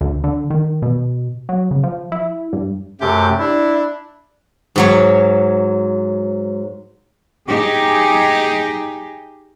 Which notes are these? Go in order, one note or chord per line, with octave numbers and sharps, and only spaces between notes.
D2
D3
D#3
B2
F#3
C#3
F3
E4
G2
F#2 C3 A3 G4
D4 E4
G#2 F#3 C#5
D#4 G4 G#4